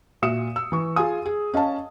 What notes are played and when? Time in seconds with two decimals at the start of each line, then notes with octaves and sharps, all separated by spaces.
0.22 A#2 F#4 E5 D#6 C#7 E7
0.56 E6
0.72 E3 C#6
0.96 F4 G#4 G#5 D#6
1.25 G#4
1.54 C#4 D#5 F5 A5